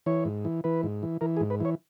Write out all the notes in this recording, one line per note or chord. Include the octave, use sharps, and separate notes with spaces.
E3 C#5
G#2
E3
E3 B4
G#2
E3
E3 A#4
G#4
G#2
B4
E3 C#5